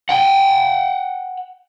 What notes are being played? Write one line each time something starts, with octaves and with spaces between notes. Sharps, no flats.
F#5 G5